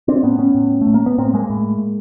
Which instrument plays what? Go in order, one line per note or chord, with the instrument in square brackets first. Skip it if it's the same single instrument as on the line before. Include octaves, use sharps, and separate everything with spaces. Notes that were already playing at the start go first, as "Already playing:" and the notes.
[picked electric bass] C4 D4
A2 B3 C#4
B3 C#4
A2
A3
A2
A#3
B3
A2 A#3 C4
G#3 A#3
A2